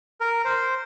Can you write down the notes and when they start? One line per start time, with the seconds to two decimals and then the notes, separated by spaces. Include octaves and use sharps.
0.21 A#4
0.45 C5